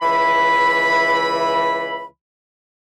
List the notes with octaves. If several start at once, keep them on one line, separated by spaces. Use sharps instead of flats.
C#2 E3 E5 B5